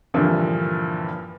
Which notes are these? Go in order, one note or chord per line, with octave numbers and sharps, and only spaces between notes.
G2 A#2 D3 E3 F3